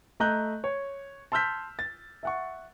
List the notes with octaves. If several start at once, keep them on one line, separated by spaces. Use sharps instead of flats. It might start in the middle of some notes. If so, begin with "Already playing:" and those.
A3 D#5 A#5 F#6 G6
C#5
A5 C6 E6 F6 G6 B6
A6
E5 F#5 C#6